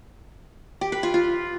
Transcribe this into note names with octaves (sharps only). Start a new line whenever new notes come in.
G4
B4
F4
F4